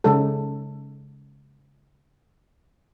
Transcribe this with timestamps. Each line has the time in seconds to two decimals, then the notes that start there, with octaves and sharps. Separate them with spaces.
0.04 C#3 G#3 A4